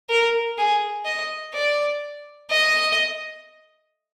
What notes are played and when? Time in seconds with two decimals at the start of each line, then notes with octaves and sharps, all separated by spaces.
0.09 A#4
0.58 G#4
1.05 D#5
1.54 D5
2.50 D#5